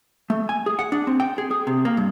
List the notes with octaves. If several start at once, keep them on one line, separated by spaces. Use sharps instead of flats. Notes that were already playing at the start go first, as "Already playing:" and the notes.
A3
G#5
G#4
F#5
D4
C4
G5
G#4
G#4
C3
A#3
G2